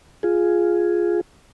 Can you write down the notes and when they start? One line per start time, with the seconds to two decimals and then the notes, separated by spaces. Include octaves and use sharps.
0.23 F4 G#4